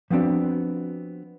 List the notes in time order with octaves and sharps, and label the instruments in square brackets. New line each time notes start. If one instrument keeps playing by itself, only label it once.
[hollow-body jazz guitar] F3 B3 C4 D4 F#4